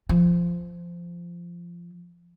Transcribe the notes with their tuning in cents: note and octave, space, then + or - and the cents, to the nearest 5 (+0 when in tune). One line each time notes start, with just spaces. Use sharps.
F3 -15